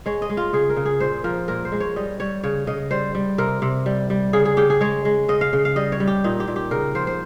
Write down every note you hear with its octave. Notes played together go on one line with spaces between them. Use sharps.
G#3 C#5
D#5
G#3
F4
C#3 G#4
A#4
C#3
G#4
A#2 C5
F3 A#4
A#2 A#4
C5
G#3
C#5
G3 D#5
G3 C#5
C#3 C#5
C#3 D#5
G3 C5
G3
C3 A#4
C3
G3
G3
C#3 G#4
G#4
C#3 G4
G#4
G#3 C#5
G#3
C#3 D#5
F5
C#3
F5
G3 D#5
C#5
G3
G4
A#2 D#4
G4
A#2
G4
C#3 A#4
F3 C5
C5